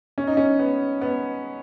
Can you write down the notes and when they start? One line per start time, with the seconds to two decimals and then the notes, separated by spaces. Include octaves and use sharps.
0.18 C#4
0.27 D#4
0.37 C#4
0.59 B3
1.01 B3